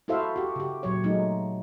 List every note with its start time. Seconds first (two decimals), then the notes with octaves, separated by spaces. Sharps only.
0.08 E4 F#4 A4 C5 E5 F5
0.36 F#4 G4
0.56 C#3 G4
0.83 A#2 F#3 C#5
1.04 F#3 G#3 A3 D#4